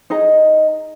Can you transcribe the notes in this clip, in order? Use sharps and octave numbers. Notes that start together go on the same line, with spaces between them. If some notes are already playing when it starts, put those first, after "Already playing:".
D#4 G#4 D#5 A#5